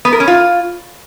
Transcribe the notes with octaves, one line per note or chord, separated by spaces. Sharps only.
B3
A#4
C#4
F4